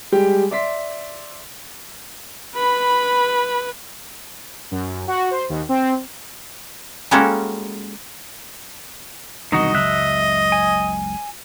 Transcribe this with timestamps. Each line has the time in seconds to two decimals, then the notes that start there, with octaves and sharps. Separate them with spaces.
0.12 G3 G#3 G4 G5
0.51 D5 E5 C6 B6
2.55 B4 B5
4.71 F#2
5.08 F#4
5.31 C5
5.49 D#2
5.69 C4
7.11 G3 G#3 A#3 C#4 F#4 A4
9.52 E1 C2 D#3 D#4 F#4 D#5
9.75 F#1 C#2 F#3 E5 F#6
10.52 G#5